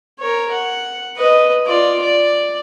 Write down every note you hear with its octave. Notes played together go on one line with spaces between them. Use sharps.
A#4 C#5
F#5
B4 D#5
F4 D5
D5